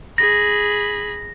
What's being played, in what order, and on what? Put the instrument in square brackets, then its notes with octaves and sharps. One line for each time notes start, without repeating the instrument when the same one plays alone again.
[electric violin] G#4 B5 [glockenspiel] A#6